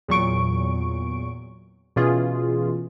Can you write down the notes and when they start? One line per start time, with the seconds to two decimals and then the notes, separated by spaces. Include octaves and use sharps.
0.08 E2 A#2 F#3 C#6 D7
1.96 B2 E3 C#4 F4 G#4